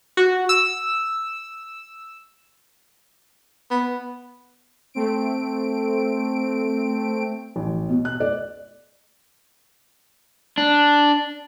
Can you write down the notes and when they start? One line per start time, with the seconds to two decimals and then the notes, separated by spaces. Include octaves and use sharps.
0.17 F#4
0.49 E6
3.71 B3
4.94 A3 C4 D7
7.56 A1
7.89 B2
8.05 F#6
8.20 D5
10.58 D4